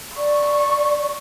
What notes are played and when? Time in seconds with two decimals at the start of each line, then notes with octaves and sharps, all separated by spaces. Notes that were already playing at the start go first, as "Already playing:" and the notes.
0.17 D5 C#6